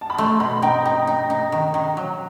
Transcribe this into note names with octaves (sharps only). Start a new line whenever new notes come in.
A5
B5
A3 C6
B2 B5
D#4 G5
D#4
D#4
D#4
D#3
D#3
F#3